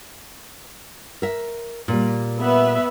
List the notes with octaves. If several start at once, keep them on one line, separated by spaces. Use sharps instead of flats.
A#4 E5
A#2 G3
B3 B4 E5